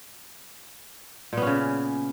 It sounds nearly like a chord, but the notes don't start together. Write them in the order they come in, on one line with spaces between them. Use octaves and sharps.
A#2 B3 C#4 C#3